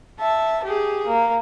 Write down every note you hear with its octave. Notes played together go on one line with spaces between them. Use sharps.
E5 A5
G4 G#4
A#3